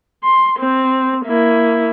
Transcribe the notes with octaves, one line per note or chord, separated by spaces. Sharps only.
C6
C4
A#3 E4